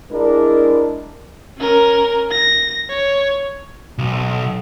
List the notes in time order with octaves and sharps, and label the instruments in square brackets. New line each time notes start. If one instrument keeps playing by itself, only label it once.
[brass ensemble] G#3 D4 E4 A#4
[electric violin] C#4 A#4
A#6
C#5
[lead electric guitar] B1